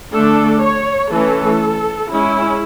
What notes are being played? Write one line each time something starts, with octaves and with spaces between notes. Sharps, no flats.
D3 A3 D4 A4
C#5
E3 A3 C#4 A4
G#3 C#4 E4